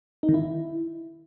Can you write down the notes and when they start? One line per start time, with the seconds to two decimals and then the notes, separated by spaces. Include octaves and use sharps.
0.23 D#4
0.29 D#3
0.34 E4